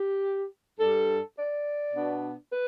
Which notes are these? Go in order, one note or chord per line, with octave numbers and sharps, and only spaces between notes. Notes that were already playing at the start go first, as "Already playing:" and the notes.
Already playing: G4
G2 G3 D4 A4
D5
B2 B3 D4
B4